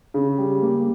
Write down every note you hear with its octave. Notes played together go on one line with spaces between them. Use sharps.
C#3
G3
A#3